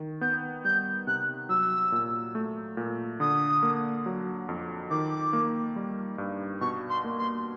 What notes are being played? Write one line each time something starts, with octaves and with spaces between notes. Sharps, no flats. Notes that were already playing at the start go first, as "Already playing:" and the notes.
Already playing: D#3
B3 G6
G3 G6
C3 F#6
F#3 E6
A#2
A3
A#2
D3 D#6
A#3
F#3
F2
D#3 D6
A#3
G3
G2
B2 C#6
C6
A#3
C6